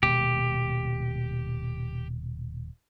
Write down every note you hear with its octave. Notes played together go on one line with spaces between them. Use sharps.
D#1 B2 G#3 G4